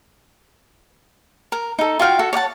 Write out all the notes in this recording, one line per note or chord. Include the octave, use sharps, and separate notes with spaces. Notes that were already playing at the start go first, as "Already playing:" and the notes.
A#4
D#4 A4
F4 F#4 F5 G5
F#4 A4
C#5 D5 F#5 A5